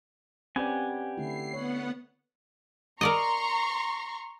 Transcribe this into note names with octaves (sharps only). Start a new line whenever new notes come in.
C4 C#4 G4 B4 D5 F#5 G#5
D3 A3 E4 C7
B3 C#5 F#5
A#4 D5 D#5 A#5 C6 C#6